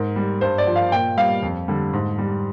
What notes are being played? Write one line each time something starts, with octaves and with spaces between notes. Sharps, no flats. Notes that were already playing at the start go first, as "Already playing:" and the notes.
Already playing: G#2 A#4
G3
G2 C5
D5
F3
F5
A#2 G5
G3 F5
F2
D3 G3
G#2
G3